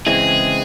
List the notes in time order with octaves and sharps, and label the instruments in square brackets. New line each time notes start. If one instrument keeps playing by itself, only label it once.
[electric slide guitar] C#3 E3 G#3 C4 E4 [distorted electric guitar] G#4